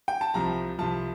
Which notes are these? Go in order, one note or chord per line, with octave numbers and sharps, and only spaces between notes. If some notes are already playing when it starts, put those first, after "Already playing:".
G5
A5
C2 C3 F3 A#5
C2 C3 F3 A5